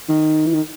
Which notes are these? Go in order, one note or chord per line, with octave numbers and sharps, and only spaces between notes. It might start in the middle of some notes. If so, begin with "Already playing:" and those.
D#3
E3
D#3